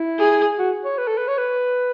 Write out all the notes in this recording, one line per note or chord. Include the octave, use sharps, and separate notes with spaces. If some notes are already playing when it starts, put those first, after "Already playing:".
Already playing: E4
G#4
F#4
C#5
B4
A4
B4
C#5
B4